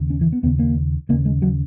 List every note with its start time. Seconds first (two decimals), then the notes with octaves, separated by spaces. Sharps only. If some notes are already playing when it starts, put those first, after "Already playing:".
Already playing: D#2 C#3
0.10 C#4
0.21 E3
0.32 B3
0.43 D#2 C#3 B3
0.59 A#3
1.09 D#2 C#3 A#3
1.25 G#3
1.42 F#3